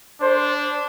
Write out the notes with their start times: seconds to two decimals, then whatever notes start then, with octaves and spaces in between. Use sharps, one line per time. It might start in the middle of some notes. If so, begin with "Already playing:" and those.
0.21 D4 C5